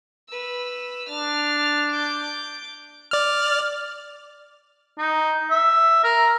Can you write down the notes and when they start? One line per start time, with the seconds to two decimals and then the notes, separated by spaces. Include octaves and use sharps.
0.29 B4 E6
1.09 D4 F6 A6
1.90 D6 G6
3.11 D5 F6
4.98 D#4
5.50 E5
6.04 A#4